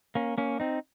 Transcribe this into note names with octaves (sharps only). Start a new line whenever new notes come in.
A#3 C#4
A#3 C#4
C4 D#4